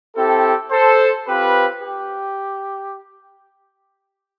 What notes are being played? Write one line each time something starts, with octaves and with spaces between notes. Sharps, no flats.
C4 E4 G4 A4
A4 C5
C4 F4 G4 B4
G4